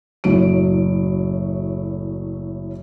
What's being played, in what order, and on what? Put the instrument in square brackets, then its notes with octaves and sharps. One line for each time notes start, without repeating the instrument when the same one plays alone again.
[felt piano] F#1 A2 F#3 D7